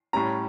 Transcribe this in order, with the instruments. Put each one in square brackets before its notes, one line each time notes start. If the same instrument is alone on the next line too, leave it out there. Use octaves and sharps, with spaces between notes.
[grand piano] A2 G3 C#4 A#5